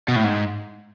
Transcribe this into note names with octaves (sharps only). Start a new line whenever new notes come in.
B2
A2
G#2